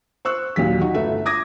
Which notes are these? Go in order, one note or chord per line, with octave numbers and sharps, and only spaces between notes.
C5 C#6 E6 F#6
D#2 A#2 F#3 B6
D#4 F#4
G1 A3 E5
D6 D#6 G#6 A#6